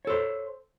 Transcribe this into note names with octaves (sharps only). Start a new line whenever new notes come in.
A4 C5 C#5